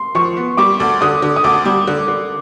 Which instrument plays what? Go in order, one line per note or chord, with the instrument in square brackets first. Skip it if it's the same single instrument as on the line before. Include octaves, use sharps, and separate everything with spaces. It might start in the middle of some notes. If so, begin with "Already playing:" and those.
Already playing: [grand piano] C6
[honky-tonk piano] F3 [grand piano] C#6
[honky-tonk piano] B3
[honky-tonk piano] G3 [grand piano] D6
[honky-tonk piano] D2
[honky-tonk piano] D3 [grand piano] D#6
[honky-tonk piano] D3
[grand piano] D#6
[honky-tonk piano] D2 [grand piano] D6
[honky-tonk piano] G3
D3
D3